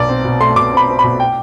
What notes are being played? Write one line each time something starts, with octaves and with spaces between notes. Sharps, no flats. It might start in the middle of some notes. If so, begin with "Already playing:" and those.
Already playing: B1 D5
C4
B2
A3 C6
B2 D6
C4 B5
C4
B5
B2
G5